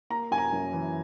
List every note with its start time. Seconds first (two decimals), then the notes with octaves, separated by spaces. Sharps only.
0.10 A#3 A#5
0.31 F#2 G#5
0.38 A#5
0.52 F#2
0.73 E3